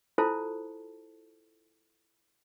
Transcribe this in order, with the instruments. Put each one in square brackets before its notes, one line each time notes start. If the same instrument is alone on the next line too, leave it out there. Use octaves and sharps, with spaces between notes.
[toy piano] E4 F4 A4 C5 A5